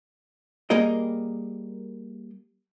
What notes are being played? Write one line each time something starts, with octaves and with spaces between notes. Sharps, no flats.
G3 A#3 G#4 A#4 D#5